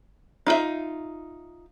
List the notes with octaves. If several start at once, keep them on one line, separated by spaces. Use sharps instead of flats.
D#4 F4 F#4 E5